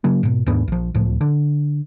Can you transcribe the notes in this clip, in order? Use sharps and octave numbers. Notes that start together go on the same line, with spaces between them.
C#3 F#3 A#3
G#2 B2
D#2 G#2 B3 D4
A#1 F3
D1 C#2 A2 F3
D3